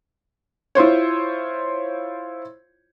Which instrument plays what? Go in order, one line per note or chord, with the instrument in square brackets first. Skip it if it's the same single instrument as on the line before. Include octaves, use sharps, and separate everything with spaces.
[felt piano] E4 F4 C5 C#5